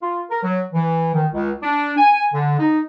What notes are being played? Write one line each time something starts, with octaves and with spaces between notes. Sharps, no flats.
F4
A#4
F#3
E3
D#3
C#2
D4
G#5
D3
D#4